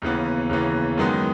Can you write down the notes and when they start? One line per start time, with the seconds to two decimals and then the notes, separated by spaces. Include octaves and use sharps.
0.02 D#2 C#3 E3 B3
0.49 D#2 C#3 E3 B3
0.98 F#2 D#3 G#3 B3 D#4